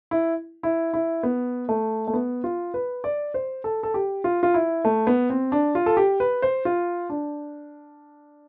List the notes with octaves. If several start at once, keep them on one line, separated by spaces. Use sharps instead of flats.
E4
E4
E4
B3
A3
A3
B3
F4
B4
D5
C5
A4
A4
G4
F4
F4
E4
A3
B3
C4
D4
F4
A4
G4
B4
C5
F4
D4